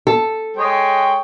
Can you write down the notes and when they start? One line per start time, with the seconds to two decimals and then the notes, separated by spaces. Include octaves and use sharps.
0.07 A4
0.57 G#3 C#5 G5